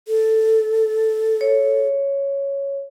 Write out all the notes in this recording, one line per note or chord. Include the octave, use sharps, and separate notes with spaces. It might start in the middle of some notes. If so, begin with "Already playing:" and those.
A4
C#5